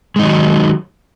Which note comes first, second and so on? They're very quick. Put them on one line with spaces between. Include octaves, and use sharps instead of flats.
G#3 D#4 D#3 F#3